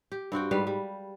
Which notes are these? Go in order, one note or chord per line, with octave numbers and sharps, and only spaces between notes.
G4
G2 C4 F#4 G5
G#2 G3 B4 F5
G3